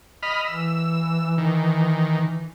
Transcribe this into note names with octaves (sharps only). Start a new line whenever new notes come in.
D#5 B5 F6
E3 E6
D#3